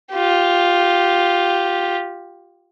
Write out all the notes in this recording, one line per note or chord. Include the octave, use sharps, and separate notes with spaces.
F4 G4